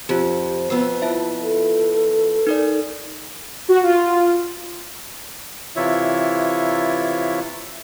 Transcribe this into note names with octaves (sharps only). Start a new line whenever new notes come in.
F2 F4 G4 C5
F2 B3 E6 C7
E4 F4 E5
A4
D#4 A#4 D5
F#4
F4
C3 E3 E4 F4 C#5 E5